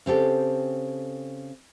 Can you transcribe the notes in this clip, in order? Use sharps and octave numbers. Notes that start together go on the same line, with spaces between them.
C#3 C4 G4 A4